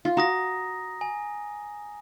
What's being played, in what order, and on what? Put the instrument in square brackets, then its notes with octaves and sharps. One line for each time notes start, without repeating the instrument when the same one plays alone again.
[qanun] F4
[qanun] F#4 [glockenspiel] A#5 D#6 A#6
[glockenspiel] G#5